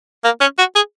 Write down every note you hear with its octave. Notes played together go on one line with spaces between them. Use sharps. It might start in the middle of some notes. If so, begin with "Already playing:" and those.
A#3
C#4
F#4
G#4